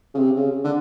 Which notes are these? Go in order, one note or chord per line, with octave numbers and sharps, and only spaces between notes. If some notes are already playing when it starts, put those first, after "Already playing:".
C#3
C3
C#3
D3